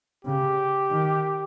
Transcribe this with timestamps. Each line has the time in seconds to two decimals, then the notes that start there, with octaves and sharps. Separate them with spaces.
0.25 C#3 G4
0.90 D#3